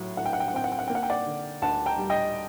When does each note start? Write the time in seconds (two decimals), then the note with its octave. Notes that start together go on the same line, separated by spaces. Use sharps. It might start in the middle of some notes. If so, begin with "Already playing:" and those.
Already playing: A2 F#3
0.17 A2 F#5
0.26 G5
0.33 F#5
0.40 G5
0.48 F#5
0.53 C4 G5
0.64 F#5
0.72 G5
0.79 F#5
0.88 A#3 G5
0.95 F#5
1.03 G5
1.10 D5 F#5
1.26 D3
1.62 D2 F#5 A5
1.86 G5 A#5
1.98 G3
2.10 D#5 G5